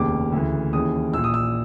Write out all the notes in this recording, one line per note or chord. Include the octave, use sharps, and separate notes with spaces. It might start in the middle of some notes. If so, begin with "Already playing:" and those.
Already playing: F1 D#2 C#3 D6
D2 C#3 E3
D#2 C#3 E3 D#6
A#1 A#2 E6
D#6
E6